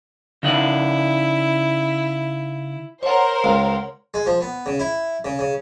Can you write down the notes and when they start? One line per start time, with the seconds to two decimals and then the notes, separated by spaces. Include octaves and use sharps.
0.43 C#3 D#4 E4 F#5
3.03 A#4 C5 C#5 F#5
3.44 C#2
4.14 G#3
4.26 F3
4.41 B3
4.66 C#3
4.79 E4
5.25 C#3
5.39 C#3